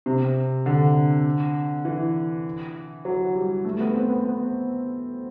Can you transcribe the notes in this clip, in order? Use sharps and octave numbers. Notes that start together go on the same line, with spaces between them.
C3
D3
E3
F#3
G3
A3
B3
C4
B3
B3